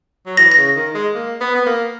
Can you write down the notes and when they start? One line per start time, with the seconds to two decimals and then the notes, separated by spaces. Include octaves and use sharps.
0.26 F#3
0.37 E3 A#6
0.52 A#6
0.57 C#3
0.76 D#3
0.95 G#3
1.15 A#3
1.41 B3
1.55 B3
1.66 A#3